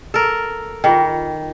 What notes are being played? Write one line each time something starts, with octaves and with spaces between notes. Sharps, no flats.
A4 A#4
D#3 F4 G#4 G5